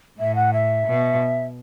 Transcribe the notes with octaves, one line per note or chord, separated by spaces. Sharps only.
A2 E5
F#5
E5
B2